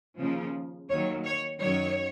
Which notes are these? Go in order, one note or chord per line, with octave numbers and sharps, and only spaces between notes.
D#2 C#3 F3
D#2 D#3 F#3 C#5
C#5
F#2 D#3 F#3 C#5